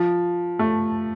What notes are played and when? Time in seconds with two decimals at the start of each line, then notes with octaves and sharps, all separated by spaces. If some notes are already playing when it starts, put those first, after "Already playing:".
Already playing: F3
0.59 A3